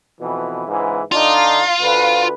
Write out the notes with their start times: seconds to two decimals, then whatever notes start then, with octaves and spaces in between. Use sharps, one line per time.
0.20 F2 B2 E3
0.68 C#2 G#2 E3
1.12 D3 D4 D#4 F4
1.80 D2 B4